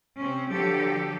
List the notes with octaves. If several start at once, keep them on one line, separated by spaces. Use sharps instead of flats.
C3 C4 C#4
D3 F3 F#3 G4 A4